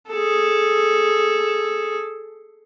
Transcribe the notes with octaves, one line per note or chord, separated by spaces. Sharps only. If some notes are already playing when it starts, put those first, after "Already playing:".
G#4 A4